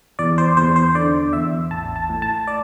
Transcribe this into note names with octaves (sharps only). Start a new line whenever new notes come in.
E2 D5
C5
E2 C5
C5
D3 D5
E2 E5
A1 A5
A5
A2
A5
D5